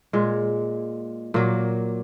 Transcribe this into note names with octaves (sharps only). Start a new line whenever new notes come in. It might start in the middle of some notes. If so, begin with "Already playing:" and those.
A#2 G#3
A#2 F#3 A#3